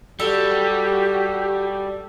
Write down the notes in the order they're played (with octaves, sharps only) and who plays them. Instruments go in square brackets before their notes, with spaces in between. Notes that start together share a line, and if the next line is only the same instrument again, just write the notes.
[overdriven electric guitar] G3 [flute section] F#4 G4 [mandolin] A4